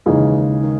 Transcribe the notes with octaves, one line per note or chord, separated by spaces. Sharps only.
D#2 C#3 E3 G#3 D#4 G#4
D#3